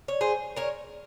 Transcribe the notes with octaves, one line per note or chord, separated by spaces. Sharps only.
C#5
G#4 C5
A#4 C#5